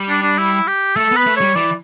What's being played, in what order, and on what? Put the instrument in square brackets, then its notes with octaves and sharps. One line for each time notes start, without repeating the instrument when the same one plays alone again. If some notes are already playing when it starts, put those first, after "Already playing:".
Already playing: [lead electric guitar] G3
[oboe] D4
D4
E4
G4
[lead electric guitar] A3 [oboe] A4
[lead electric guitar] B3 [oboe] B4
[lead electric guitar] A3
[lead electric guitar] G3 [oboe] C#5
[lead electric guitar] E3 [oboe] D5